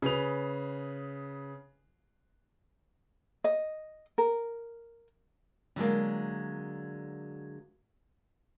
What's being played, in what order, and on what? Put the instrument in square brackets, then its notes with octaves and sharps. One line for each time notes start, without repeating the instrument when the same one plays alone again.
[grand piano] C#3 G#4 B4 F7
[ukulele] D#5
A#4
[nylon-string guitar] D3 F#3 G#3 A#3